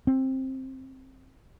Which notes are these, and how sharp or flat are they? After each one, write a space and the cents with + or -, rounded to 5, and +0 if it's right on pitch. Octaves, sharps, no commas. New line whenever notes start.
C4 +15